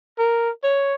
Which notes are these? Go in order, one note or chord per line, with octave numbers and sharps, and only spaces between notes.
A#4
C#5